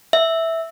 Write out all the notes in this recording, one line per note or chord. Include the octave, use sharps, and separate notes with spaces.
E5